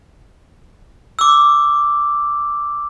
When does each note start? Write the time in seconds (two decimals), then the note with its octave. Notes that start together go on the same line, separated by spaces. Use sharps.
1.19 D6 E6